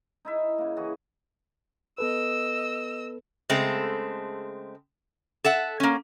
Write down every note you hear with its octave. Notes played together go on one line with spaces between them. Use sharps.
D#4 E4 E5
C#3 A#3
E3 F#4 G#4
B3 A4 B4 D#5 E6
C#3 G#3 A3 C4 A4
A4 E5 F#5
A#3 C#4